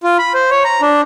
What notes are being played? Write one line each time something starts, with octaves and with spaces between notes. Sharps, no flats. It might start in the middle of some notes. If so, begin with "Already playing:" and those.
F4
B5
C5
C#5
A#5
D4